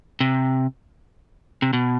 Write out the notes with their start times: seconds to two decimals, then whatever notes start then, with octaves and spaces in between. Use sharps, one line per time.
0.20 C3
1.62 C3
1.73 B2